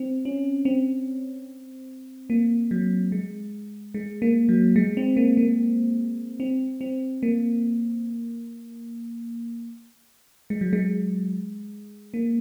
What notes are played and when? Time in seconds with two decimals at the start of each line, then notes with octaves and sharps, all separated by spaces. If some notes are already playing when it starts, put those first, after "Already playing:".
Already playing: C4
0.25 C#4
0.65 C4
2.30 A#3
2.71 F#3
3.12 G#3
3.94 G#3
4.22 A#3
4.49 F#3
4.76 G#3
4.97 C4
5.17 A#3
5.37 A#3
6.40 C4
6.81 C4
7.23 A#3
10.50 G#3
10.61 F#3
10.73 G#3
12.14 A#3